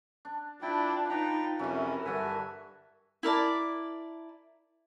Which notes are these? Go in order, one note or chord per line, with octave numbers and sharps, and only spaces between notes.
D4
D4 E4 F4 B4 G5 A5
D#4 B4 D5 G5 A#5
F2 C3 E3 F#3 C#4 A#4
G2 D3 E5 F#5 G#5 A5
E4 A#4 D5 A5